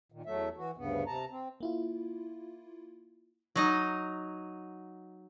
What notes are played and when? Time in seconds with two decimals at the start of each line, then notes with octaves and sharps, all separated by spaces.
0.12 A#2 D#3
0.26 E2 F#3 A3 E5
0.57 E3 F#4
0.77 D2 G2 C#3 B3
1.07 C3 A5 A#5
1.31 C4
1.61 A#3 E4 F4
3.56 F#3 D#4 D#5